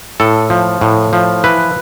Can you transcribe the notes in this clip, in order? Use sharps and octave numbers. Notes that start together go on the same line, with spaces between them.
A2 A4
F3
A2
F3
E3 B4